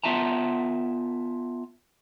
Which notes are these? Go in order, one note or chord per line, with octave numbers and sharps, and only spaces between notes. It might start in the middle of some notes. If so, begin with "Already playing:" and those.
B3 F4 E5 A5 A#5